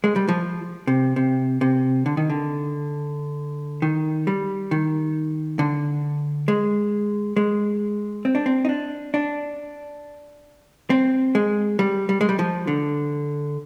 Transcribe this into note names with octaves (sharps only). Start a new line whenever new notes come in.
G#3
G3
F3
C3
C3
C3
D3
D#3
D3
D#3
G3
D#3
D3
G#3
G#3
C4
D4
C4
D#4
D4
D4
C4
G#3
G3
G3
G#3
G3
F3
D3